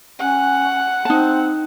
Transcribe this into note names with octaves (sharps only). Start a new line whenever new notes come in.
C#4 F#5
C4 D#4 A5